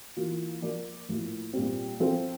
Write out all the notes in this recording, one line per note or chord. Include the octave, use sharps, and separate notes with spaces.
E3 A#3 F4
F3 A#3 F4 A#4 D5
A2 F3 A#3 E4
A#2 G3 C4
F3 C4 F4 A4 C5